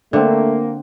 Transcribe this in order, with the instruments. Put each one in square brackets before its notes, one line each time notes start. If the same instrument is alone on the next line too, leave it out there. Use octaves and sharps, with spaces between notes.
[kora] D3 C4 [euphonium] A3 [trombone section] A#3